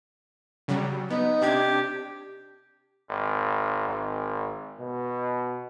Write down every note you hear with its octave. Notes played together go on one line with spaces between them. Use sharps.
C#3 F#3 G3
B3 D#4
C3 D4 G4 G#6
G#1
G#1
B2